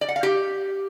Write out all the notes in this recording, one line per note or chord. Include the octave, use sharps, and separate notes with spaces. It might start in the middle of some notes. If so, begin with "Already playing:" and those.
D5
F#5
F5
G4